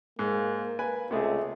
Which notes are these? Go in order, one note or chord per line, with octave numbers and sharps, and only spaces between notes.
G#2 A#3
B4 G#5
C#2 C3 A3 G#4